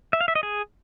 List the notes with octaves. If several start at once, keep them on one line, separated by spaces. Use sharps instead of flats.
E5
F5
E5
D#5
G#4